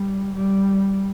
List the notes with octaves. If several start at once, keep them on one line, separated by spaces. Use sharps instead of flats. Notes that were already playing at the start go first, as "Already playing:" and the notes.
Already playing: G3
G3